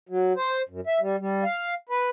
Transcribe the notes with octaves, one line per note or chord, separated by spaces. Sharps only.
F#3
C5
F#2
E5
G3
G3
F5
B4